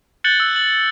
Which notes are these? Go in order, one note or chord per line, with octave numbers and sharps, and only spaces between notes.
F#6 G6 A6 C#7 F#7 G7
E6
F#7